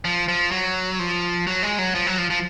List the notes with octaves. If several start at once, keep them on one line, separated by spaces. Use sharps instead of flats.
F3
F3
F#3
F3
F#3
G#3
F#3
F3
F#3
F3
F3